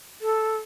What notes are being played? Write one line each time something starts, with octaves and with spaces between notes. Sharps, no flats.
A4